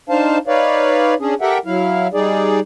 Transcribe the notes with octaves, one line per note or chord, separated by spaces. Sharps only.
D4 D#4 C5 F5 A5
D#4 B4 C#5 D5 F5
C#4 D4 G#4
G4 A4 A#4 E5 F#5 G5
F#3 E4 F5
G3 D#4 G#4 D5